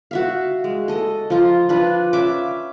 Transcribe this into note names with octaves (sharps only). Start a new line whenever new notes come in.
F#4 E5 F5
G#3
A4 D#5
F3 F4 A#5
D4 F4 B4
C#4 E5 D6